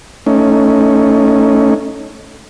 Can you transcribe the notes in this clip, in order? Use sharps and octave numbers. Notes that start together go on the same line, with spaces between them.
A3 C#4 D#4